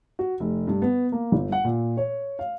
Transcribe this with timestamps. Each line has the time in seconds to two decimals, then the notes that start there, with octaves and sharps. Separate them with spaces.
0.19 F#4
0.40 F1
0.67 G2
0.82 B3
1.12 A#3
1.32 G1
1.52 F#5
1.65 A#2
1.97 C#5
2.39 F5